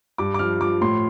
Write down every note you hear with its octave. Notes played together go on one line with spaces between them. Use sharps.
G2 D6
D6
F3 F6
F3 D6
A2 C6